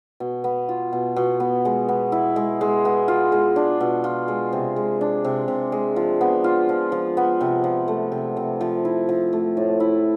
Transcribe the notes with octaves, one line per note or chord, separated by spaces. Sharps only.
B2
B3
F4
B2
B2
B3
G#3
B3
E4
G#3
G#3
B3
F4
G#3
D4
B2
F4
G#3
C3
G#3
D4
C3
C3
G#3
F3
B3
F4
F3
F3
B3
C3
F3
A3
C3
C3
F3
E4
F3
A3
A2
E4